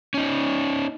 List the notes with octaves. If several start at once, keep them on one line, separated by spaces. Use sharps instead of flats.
C#4 D#4